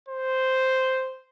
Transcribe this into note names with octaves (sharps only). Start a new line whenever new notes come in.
C5